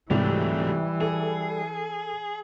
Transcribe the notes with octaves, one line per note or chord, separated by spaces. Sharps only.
C2 G#2 E3 F#3 G3 A3
G#4 A4